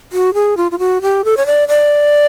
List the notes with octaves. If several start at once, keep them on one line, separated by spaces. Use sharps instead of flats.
F#4
G#4
F4
F4
F#4
G4
A4
C#5
D5
D5